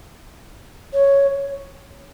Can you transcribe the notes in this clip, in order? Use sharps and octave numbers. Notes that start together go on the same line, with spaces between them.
C#5